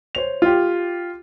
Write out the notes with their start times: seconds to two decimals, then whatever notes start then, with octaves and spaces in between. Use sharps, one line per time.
0.15 C5 C#5 F7
0.42 F4 G4